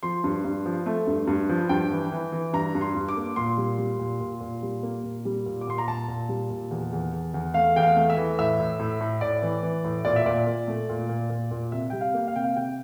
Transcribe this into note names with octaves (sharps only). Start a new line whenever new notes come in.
F3 C6
G2
G2
F3
A3
G2
G2
F3
G2 G5
E3
E3
E3
G2 A#5
G2
C6
G2
D6
A#3
A#2 C6
G3
G3
A#2
A#2
A#2
G3
A#3
A#2
G3
A#2
D6
A#2 C6
A#5
A#2 A5
A#2
G3
A#2
E2
E2
E2
E2
A3 F5
E2 G5
F5
A3
E5
E3
A2 E5
A2
A2
A2
A2 D5
E3
E3
A2
A#2 D5
E5
A#2 D5
A#2
A3
A#2
A#2
A#2
A#2
C3 E5
G3 G5
F5
A#3
F5
C3 G5
F5
C3 G5